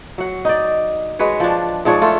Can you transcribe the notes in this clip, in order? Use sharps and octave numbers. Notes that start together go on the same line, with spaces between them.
F#3 F#5
D#4 D5
G#3 F#4 B4 C#5
F3 D4
G#2 F3 D4 C#5
A3 F4